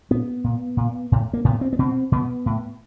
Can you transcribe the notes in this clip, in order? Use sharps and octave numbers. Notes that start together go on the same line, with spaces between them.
A#2 B3
A#2
A#2
A2
A#3
A2 B3
C4
B3
B2 C4
B2 B3
A2